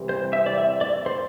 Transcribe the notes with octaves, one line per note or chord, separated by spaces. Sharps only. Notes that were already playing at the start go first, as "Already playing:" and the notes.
Already playing: C2 C3 E3 G3 C4
C5
E5
D5
E5
D5
C5